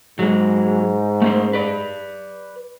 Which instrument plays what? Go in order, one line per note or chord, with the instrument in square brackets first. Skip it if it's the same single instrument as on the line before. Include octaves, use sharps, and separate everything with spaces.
[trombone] G#2 [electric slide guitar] F#3 G#3
[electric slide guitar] A3 C#4 C5
B4 D5